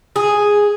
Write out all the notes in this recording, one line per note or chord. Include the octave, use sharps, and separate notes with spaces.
G#4